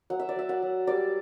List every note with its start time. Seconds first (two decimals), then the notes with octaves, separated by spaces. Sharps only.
0.10 F#3 F#5
0.20 E5
0.29 D5
0.36 F#3 E5
0.49 F#5
0.62 F#3
0.87 G3 D5